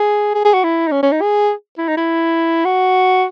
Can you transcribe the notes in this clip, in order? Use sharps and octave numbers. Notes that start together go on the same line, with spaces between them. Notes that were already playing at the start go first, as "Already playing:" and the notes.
Already playing: G#4
G#4
G#4
F#4
E4
D#4
C#4
C#4
D#4
G#4
E4
D#4
E4
F#4